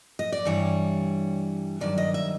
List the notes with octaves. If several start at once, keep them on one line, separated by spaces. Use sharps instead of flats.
D#5
D5
G2 E3 G3 C#5
G2 D#3 F#3 D5
D#5
E5